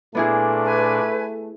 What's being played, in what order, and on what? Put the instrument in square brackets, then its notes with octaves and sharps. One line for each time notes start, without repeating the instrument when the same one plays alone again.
[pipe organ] A#2 D4 [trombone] A3 [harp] B3 E4 G#4
[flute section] B4 G#5